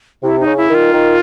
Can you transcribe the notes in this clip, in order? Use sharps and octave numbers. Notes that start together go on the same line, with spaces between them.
C3 E4
D#4
C#3
E4
D#3
F4
D#3